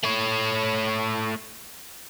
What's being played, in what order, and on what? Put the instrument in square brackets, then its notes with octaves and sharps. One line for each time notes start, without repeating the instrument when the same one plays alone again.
[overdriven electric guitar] A3 C#5